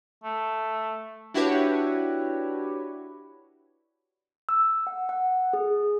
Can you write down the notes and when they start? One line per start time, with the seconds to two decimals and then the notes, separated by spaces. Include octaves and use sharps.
0.24 A3
1.34 D4 E4 F#4 G4 B4 C#5
4.49 E6
4.87 F#5
5.09 F#5
5.53 G#4